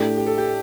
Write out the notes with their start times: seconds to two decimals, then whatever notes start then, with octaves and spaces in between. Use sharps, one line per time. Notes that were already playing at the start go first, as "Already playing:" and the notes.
Already playing: A2 A3 D4 G4
0.17 G4
0.27 A4
0.38 G4